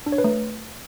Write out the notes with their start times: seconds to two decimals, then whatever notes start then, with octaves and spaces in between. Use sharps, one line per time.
0.06 D4
0.12 C#5
0.18 B4
0.24 A3